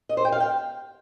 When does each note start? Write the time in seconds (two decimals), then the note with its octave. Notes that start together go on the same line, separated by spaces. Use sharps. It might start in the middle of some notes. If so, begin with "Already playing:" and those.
0.09 D#5
0.17 C5
0.25 G5
0.32 F5
0.40 G5